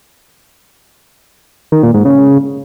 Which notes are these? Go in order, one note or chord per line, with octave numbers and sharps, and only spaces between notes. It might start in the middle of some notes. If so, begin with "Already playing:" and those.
D#3
A#2
G#2
C#3